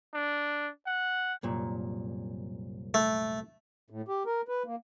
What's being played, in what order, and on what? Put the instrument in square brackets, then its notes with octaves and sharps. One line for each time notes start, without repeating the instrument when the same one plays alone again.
[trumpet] D4
F#5
[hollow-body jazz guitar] C2 F#2 A#2
[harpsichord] A3
[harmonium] A2
G4
A#4
B4
A#3